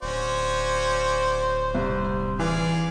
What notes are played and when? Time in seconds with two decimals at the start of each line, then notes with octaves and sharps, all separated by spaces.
0.02 D1 C#4 F#4 C5 D5
1.75 C2
2.39 E3 G#4 D5 F5